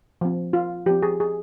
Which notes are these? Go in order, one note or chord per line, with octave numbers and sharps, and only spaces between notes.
F3 C4
F4
F3 C4 G4
G#4
G#4